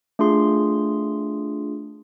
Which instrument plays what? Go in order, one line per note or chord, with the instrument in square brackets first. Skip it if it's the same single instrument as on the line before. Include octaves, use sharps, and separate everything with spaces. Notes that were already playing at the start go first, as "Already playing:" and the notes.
[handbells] A3 D4 F4 G#4 C6